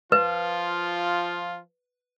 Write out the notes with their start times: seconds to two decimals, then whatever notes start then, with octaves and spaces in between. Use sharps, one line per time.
0.12 F3 F4 B4